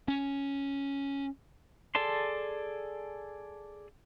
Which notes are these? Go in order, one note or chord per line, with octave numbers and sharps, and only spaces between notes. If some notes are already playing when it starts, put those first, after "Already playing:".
C#4
G#4 A4 D5 A5 C6